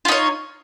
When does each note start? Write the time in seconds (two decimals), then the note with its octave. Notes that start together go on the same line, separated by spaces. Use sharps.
0.05 F4
0.08 D#4
0.12 C#5